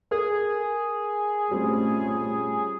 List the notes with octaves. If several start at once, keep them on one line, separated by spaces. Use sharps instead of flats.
G#4 A#4
G3 A3 C4 C#4 F4